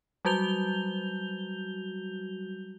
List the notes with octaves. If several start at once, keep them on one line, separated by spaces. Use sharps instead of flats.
F#3 G3 F#4 G6 F7 G7